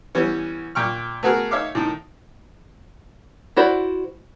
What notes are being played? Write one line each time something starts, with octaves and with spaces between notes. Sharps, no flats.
E3 G3 B3 C#4
A#2 G5 C#6 F6
A3 B3 F#4 G#4 A#4
D#4 C#5 E5 F5 D6
A2 D#3
E4 F#4 C5 D5